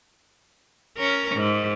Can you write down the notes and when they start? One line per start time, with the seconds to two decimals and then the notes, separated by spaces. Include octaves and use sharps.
0.97 C#4 A#4
1.35 G#2